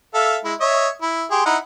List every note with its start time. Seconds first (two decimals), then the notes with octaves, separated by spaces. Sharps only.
0.14 A4 E5 F5
0.44 G#3 E4
0.61 C#5 D#5 E5
1.02 E4
1.32 G4 G#4 C6
1.46 D#4 E4 F#5